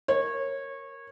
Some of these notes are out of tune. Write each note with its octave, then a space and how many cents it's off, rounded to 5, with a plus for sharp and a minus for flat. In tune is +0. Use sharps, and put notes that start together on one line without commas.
A#4 +0 C#5 -20